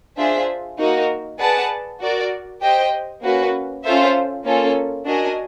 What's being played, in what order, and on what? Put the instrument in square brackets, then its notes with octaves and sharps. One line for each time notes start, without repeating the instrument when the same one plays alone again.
[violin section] D4 F4 G#4 C5 E5
A#3 D#4 F#4 A#4
G#4 B4 D5 F#5 A5
F#4 A#4 D5
G4 C5 D#5 G5
A#3 C#4 F#4 B4
C#4 F4 A4 C5 E5
A#3 C#4 F4 A4
D4 F#4 A#4 D#5 G#5